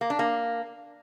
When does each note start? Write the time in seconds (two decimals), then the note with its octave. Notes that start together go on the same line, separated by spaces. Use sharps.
0.01 A#3
0.10 D4
0.19 A#3